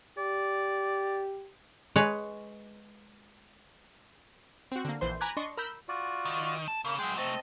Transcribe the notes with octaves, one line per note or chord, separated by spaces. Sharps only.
G4 D5
G#3 G#4 B4 C#5
C4 F#4
D3 A#3
A#1 E3 C5 C6
G#5 A#5 B5 D6 F#6 G#6
D4 D#5 C6 C#6
A#4 B5 E6 G6
F4 F#4 D5
D#3
A5
C#3 A#3
F#3 G#3 G#4 G5
C3 A3 C4 D#5 A5